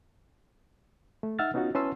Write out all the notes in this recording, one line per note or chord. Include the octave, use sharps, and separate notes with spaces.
A3
D#4 E5 F#5 E6 F6 A6
B3 C#4 D#4 F4 F#4
C#4 E4 B4 A5 C6 E6